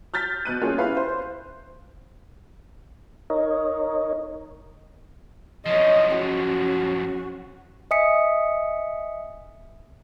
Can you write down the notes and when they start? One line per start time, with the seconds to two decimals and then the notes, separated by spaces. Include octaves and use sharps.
0.14 F6 G6 A6 B6
0.45 B2 F#6 D#7
0.62 G3 A#3 C#4 F4 G#4
0.78 C#4 E4 B4 F5
0.97 C5
3.30 D#4 A#4 C#5 D#5
5.66 F#2 F3 C#5 D#5
6.12 C#4 F#4
7.91 D#5 E5 G#5 D#6 B6 C#7